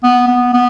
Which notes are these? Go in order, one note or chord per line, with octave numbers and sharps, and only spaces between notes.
B3
B3
B3